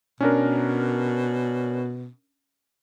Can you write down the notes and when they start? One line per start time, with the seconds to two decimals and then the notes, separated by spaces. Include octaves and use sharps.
0.21 B2 C#4 D4 A#4